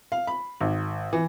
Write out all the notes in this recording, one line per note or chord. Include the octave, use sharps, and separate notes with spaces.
F5
B5
G#1
E3